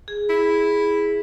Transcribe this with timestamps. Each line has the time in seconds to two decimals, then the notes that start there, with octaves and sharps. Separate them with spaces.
0.08 G#4
0.30 E4